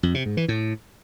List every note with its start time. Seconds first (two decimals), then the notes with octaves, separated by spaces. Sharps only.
0.03 F2
0.14 C3
0.26 G#2
0.37 E3
0.48 A2